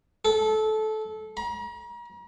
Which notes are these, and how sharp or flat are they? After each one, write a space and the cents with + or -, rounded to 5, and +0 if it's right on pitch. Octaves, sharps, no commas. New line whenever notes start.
A4 -20
A#5 +40